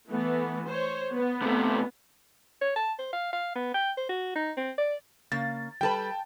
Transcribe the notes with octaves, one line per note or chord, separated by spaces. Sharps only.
E3 A3 B3
C5 C#5
B3
C3 A3
C#5
A5
C5
F5
F5
B3
G5
C5
F#4
D#4
C4
D5
C#3 A#3 A6
G3 A4 B4 G5 A5